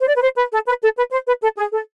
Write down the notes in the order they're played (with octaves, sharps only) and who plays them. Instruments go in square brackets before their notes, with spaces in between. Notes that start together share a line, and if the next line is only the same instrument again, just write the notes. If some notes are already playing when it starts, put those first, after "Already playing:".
[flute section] C5
D5
B4
C5
B4
A4
B4
A4
B4
C5
B4
A4
G#4
A4